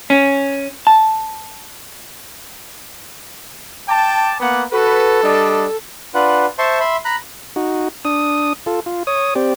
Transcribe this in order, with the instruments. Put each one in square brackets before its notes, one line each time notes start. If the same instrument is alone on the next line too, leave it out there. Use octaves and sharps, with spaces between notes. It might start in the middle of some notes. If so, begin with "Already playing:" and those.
[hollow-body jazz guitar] C#4
A5
[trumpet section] G5 A5 [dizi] D6
[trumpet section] A#3 B3 F#5
[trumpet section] F#4 B4 [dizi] A4
[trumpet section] G3 D4 D#5
[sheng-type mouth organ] D4 F4 B4 F#5
C5 E5 A5 C6 C#6
E5 B5 C6
A#5 B5 F#6
[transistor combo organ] D#4 F#4
D4 D#6
F4 A4
F4
C#5 D#6
C4 G4 D5